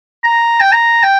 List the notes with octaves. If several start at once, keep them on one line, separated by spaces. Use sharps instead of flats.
A#5
G5
A#5
G5